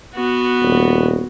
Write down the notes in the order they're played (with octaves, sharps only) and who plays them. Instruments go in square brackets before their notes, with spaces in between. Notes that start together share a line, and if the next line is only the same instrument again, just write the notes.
[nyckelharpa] B3 F#4
[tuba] D#1